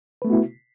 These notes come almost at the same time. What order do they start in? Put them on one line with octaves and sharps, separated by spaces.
B4 A3 B3 F#4 E4